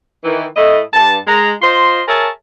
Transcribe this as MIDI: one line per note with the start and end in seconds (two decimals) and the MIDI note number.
0.24 0.46 51
0.24 0.46 52
0.56 0.80 45
0.56 0.80 57
0.56 0.80 64
0.56 0.80 75
0.94 1.17 43
0.94 1.17 81
1.28 1.52 56
1.28 1.52 82
1.61 2.01 65
1.61 2.01 72
1.61 2.01 75
1.61 2.01 84
2.07 2.28 68
2.07 2.28 70
2.07 2.28 73
2.07 2.28 76
2.07 2.28 81